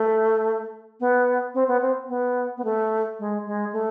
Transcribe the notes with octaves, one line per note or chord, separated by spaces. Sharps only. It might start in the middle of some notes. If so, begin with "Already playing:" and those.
Already playing: A3
B3
C4
B3
C4
B3
B3
A3
G#3
G#3
A3